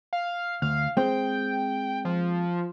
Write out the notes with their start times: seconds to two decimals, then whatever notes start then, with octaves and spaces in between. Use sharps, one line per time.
0.13 F5
0.62 D2 F5
0.97 G#3 C4 C5 G5
2.05 F3